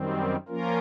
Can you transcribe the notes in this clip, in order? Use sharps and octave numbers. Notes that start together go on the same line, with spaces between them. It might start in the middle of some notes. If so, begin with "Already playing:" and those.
Already playing: F#2 D#3 G3 C4
F3 A#3 C#4 F4 A#4